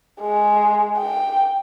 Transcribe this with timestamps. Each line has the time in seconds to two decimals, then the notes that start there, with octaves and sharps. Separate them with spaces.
0.21 G#3
0.98 G5